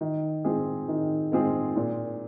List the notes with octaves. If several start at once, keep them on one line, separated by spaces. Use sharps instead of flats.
D#3
G#3 C4 F4 G#4
D#3
G#3 C4 F4 G#4
A#2